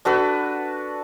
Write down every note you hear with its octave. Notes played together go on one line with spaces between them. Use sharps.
D4 F#4 A4 B4